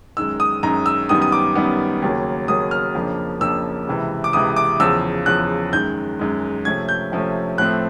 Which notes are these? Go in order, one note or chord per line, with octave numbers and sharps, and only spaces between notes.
F#2 D#3 G#3 E6
D#6
F#2 D#3 G#3 A#5
E6
F#2 D#3 G3 B3 D#6
D#6
D6
F#2 D#3 G3 B3
D#2 C#3 F#3 A#3
D#2 C#3 F#3 A#3 D#6
F6
F2 C#3 F3 A#3 D4
F2 C#3 F3 A#3 D4 E6
C#2 C3 E3
D6
C#2 C3 E3 D#6
D6
E2 C#3 F3 E6
E2 C#3 F3 F#6
F#2 D#3 G#3 G6
F#2 D#3 G#3
C3 F3 A3 C#4 G#6
G6
C3 F3 A3 C#4
A2 F3 A3 C4 F#6